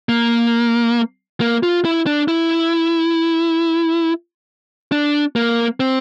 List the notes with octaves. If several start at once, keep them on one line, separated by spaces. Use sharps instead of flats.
A#3
A#3
F4
E4
D4
E4
D4
A#3
C4